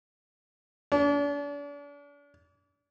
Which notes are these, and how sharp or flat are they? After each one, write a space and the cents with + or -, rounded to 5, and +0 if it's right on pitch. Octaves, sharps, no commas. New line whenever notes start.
D4 -40